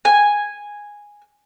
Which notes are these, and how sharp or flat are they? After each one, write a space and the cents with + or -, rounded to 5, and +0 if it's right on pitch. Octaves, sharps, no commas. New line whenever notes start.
G#5 -5